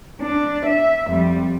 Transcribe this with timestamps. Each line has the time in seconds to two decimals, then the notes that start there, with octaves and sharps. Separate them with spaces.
0.22 D4
0.66 E5
1.07 F2 G3